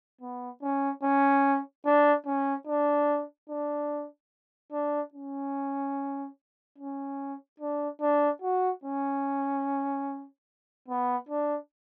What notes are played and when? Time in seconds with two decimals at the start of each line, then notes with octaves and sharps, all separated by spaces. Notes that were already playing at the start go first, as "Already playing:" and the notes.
0.21 B3
0.62 C#4
1.03 C#4
1.85 D4
2.26 C#4
2.67 D4
3.49 D4
4.72 D4
5.14 C#4
6.78 C#4
7.60 D4
8.01 D4
8.42 F#4
8.84 C#4
10.88 B3
11.29 D4